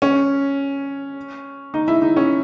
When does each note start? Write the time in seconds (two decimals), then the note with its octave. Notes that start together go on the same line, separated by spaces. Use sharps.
0.02 C#4
1.74 D#4
1.88 E4
2.02 D#4
2.17 C#4